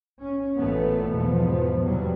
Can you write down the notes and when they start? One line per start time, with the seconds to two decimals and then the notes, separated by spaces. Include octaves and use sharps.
0.21 C#4
0.58 A1 A#2 E3 A3 B3
1.12 E2 G#2 B2 F3 B3
1.83 E2 C3 F#3 G3